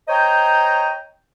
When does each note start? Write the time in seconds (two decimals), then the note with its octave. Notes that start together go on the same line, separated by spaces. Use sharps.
0.09 C5 C#5 D#5 G5 A#5